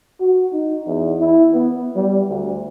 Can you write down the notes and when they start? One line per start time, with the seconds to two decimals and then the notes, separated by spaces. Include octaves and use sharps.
0.20 F#4
0.53 D#4
0.87 E2
1.19 E4
1.54 B3
1.96 G3
2.29 D2